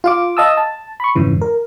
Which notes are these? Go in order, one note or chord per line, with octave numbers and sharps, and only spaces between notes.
F4 F5 D6
D#5 F5 A5 D#6 E6
A5
B5 C#6
F2 G#2 C#3 E3
A#4